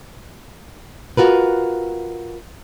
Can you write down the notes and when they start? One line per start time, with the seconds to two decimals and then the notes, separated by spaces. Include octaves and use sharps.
1.17 F4 F#4 A#4 B4